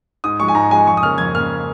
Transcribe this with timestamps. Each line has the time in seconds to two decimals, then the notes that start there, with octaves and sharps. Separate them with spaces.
0.24 G#2 D#6
0.40 F3 G#3 C#6
0.48 G#5
0.55 G#2 A#5
0.71 F3 G#3 G#5
0.86 F2 C#6
0.97 D#6
1.03 C#3 A#3 F6
1.18 F2 G#6
1.34 C#3 A#3 F6